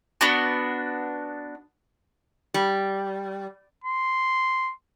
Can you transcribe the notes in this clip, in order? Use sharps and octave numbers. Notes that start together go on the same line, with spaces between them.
B3 D4 F#4
G3
C6